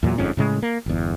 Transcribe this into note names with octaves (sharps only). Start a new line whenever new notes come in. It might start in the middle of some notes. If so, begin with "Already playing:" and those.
E2 A#2 F#3
G1 F2 G#2 C#4
A2 C#3 G#3
A#3
G1 E2